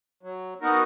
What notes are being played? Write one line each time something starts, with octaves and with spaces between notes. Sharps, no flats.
F#3
B3 D#4 F#4 A#4